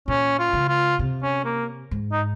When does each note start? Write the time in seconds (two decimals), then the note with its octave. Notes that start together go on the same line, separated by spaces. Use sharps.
0.08 A#2 C#4
0.39 F4
0.53 C#3
0.68 F4
0.99 C3
1.23 C#4
1.45 A#3
1.91 G#2
2.12 D#4